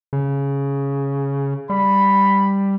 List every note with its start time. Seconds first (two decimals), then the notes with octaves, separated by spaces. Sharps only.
0.13 C#3
1.70 G3 B5